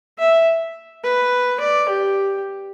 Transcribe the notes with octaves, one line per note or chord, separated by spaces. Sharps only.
E5
B4
D5
G4